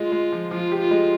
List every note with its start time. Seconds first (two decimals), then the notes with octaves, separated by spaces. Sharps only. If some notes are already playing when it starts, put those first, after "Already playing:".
Already playing: G#3 F4
0.12 G#3
0.32 F3
0.51 F3 F4
0.72 G4
0.81 F4
0.91 G#3